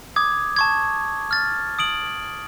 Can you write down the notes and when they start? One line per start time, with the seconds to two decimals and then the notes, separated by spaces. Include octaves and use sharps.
0.16 D6 D#6 G#6
0.56 A5 C#6 G#6
1.31 F6 A6
1.79 D#6 D7 F#7